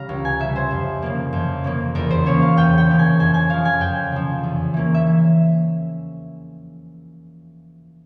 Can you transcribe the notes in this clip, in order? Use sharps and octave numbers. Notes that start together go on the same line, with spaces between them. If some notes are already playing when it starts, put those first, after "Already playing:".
Already playing: C#3 G3 F5 A#5
C#2
G#5
C#3 G3 E5
C5
F2
C#3 F3 A#3
F2
C#3 F3 A#3
E2 A#4
C5
C#3 F3 A#3 C#4 C#5
F5
E2 G5
G5
C#3 F3 A#3 C#4
G#5
F2 G#5
G#5
C#3 F3 F5
G#5
F2 G5
C#3 F3
E2
E3 A#3 C#4
E5